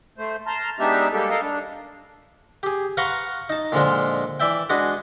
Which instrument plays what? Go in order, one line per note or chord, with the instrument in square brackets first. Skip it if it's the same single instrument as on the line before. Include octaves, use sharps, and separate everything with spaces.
[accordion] A3 C5
A5 A#5 C6 F6
G#3 B3 D4 D#4 G4 E5
G3 G#3 A#3 G4 A4
A4 A#4 D#5 F5
D4
[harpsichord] G4 G#4
B4 F5 F#5 A#5 C6 C#6
D#4 A5
A#2 D3 F3 G#3 F4
E3 D5 E5 G5
G#3 D4 F#4 G#4 B4